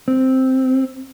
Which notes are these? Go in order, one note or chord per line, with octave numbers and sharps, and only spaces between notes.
C4